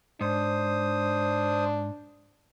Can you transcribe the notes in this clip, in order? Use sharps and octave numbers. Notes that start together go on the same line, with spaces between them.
G#2 D4 C5 D#6